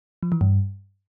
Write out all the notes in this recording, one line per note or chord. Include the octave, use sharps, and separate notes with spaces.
F3
E3
G2